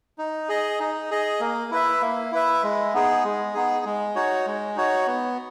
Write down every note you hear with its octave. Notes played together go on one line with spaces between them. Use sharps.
D#4
G#4 D#5
D#4
G#4 D#5
A#3
E4 B4 E5
A#3
E4 B4 E5
G#3
B3 D#4 G#4
G#3
B3 D#4 G#4
G#3
D#4 F#4 C#5
G#3
D#4 F#4 C#5
B3